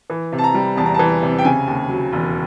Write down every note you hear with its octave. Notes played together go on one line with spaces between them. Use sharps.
E3
C3
A5
A#5
G3
E2 A5
A#5
E3 A5
C3
G5
C#3 G#5
D#2
F#3
E1